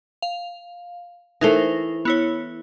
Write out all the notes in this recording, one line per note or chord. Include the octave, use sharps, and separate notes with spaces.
F5
E3 A3 D#4 A#4 C5
B3 E4 C#5